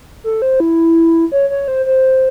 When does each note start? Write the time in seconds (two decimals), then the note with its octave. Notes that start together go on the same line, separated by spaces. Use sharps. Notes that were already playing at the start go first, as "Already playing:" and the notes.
0.24 A4
0.42 C5
0.60 E4
1.32 C#5
1.50 C#5
1.68 C5
1.86 C5